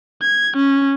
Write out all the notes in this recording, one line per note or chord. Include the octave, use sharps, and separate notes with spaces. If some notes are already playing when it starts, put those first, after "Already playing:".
G#6
C#4